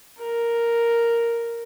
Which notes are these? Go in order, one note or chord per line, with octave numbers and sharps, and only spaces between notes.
A#4